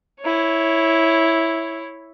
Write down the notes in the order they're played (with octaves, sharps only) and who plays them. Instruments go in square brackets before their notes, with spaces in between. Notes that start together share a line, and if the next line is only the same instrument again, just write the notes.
[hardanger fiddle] E4 C#5